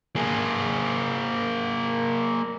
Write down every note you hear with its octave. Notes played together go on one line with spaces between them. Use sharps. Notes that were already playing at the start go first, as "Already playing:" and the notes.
A#3 G#4